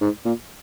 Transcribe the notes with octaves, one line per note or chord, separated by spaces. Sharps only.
G#2
A#2